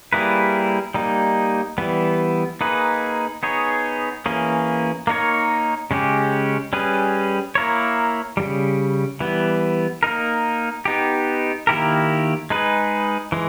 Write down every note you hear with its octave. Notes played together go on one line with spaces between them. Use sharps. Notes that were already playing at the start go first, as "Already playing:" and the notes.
G3 A#3 E4 G#4 B4
G3 A#3 D#4
E3 G3 B3
A#3 D#4 G#4 B4
B3 D#4 G#4 C#5
E3 A#3 C#4 G#4
A#3 D#4 A#4 C#5
C#3 G#3 C#4 G4
G3 C#4 G#4 B4
A#3 E4 A#4 C#5
C#3 E3 G3
E3 G3 B3
A#3 D#4 A#4
B3 D#4 G4
D#3 A#3 E4 G4 A#4
G#3 D#4 G#4 B4
E3 G#3